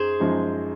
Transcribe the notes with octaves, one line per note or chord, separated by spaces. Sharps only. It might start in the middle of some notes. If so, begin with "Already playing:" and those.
Already playing: F#2 D#4 G#4 C5
F#2 F3 G#3 D#4